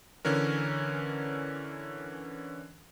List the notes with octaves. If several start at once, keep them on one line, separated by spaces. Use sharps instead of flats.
D3 E3 C#4 A#4